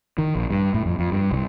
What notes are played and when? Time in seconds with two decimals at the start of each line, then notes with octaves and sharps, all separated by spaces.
0.18 D#3
0.35 A#1
0.51 G2
0.74 A2
0.86 F2
0.99 F2
1.12 G2
1.31 C2